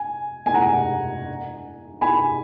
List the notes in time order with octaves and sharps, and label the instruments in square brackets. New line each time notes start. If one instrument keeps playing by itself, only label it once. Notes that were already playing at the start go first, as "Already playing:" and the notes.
Already playing: [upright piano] G#5
G#5
F#5 A#5
G#5 B5